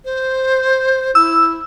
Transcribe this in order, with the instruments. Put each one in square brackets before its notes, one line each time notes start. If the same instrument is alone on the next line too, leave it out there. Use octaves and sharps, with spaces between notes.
[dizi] C5
[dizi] E4 [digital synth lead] E6